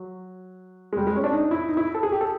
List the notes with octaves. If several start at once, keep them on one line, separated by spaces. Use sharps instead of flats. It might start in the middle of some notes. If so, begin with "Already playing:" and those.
Already playing: F#3
G#3
G3
G#3
C#4
D4
D#4
E4
D#4
E4
A4
G#4
G4
A4